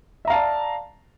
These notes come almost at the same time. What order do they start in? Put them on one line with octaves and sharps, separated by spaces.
E5 A#5 F5 A5 D5